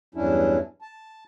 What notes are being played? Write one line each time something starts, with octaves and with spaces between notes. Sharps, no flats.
E2 G2 F#3 C#4 D4 E4
A5